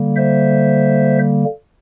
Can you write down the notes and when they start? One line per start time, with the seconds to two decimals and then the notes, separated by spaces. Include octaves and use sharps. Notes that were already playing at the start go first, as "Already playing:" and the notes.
Already playing: D3 G3 A#3
0.16 C5 E5